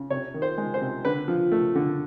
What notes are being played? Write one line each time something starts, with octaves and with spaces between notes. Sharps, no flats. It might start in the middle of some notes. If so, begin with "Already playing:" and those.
Already playing: C#3
C3 C#5
D#3
C5
G#3
C5
C3
D3 B4
F3
A3
D3